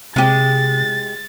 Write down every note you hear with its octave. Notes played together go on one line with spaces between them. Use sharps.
C3 G#3 G4 A6